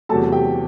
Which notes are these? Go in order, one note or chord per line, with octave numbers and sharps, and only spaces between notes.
E2 C3 F#3 A3 A4 A5
G4 G5